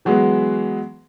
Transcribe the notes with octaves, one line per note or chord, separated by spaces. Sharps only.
E3 F#3 G#3 B3 G#4 B4